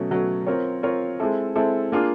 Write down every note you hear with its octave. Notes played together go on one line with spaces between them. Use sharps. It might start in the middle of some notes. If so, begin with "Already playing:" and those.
Already playing: B2 F#3 A3 C#4
B2 F#3 A3 C#4
C4 F4 A#4 C#5
C4 F4 A#4 C#5
G#3 C4 E4 A4
G#3 C4 E4 A4
A#3 D4 F4 G#4